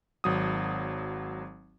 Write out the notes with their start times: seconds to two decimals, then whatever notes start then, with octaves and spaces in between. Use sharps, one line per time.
0.24 G#1 F#3 D#6